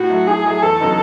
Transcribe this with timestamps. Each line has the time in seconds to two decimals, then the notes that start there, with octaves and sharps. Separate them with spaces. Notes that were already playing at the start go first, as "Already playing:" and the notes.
Already playing: A2 F#4
0.10 F#3 A3
0.28 A2 G#4
0.45 F#3 A3
0.63 E2 A4
0.80 C#3 F#3 B3 D#4